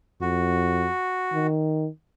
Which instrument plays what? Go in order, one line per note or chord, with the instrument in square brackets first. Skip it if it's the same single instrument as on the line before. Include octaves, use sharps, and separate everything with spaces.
[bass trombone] F2 [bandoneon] F#4
[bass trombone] D#3